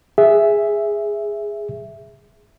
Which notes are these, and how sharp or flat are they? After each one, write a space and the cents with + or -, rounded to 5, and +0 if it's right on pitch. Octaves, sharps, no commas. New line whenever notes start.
G#4 -5 E5 +0